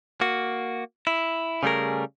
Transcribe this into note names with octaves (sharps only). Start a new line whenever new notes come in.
A#3 F#4
E4
C#3 G3 A3 G#4 A#4